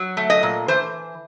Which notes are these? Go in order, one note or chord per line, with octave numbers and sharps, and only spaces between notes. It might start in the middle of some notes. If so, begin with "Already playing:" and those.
Already playing: F#3
A3
D#5
A#2
E3 C5